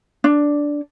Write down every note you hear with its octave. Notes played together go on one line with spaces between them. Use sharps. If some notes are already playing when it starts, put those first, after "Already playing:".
D4